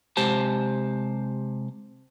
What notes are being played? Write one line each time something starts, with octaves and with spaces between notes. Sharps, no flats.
C3 G#3 G4 C5 A5